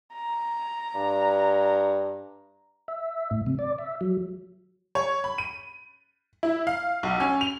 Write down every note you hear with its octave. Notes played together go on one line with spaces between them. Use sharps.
A#5
G2
E5
A2
C3
D5
E5
F#3
C#5
B5
D#7
E4
F5
B1
C#4
F7